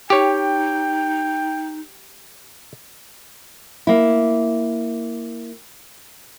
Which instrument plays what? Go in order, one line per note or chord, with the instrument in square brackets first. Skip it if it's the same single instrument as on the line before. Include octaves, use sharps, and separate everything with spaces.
[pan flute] D#4 [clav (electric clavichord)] G4 C#5 [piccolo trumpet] G5
[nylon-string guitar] A#3 E4